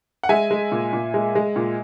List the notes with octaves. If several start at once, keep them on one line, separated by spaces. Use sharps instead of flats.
F#5
G#3 E5 G#5
G#3
A#2
A#2
G#3
G#3
A#2